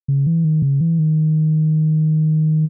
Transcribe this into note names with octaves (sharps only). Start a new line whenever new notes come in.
C#3
E3
D#3
C#3
E3
D#3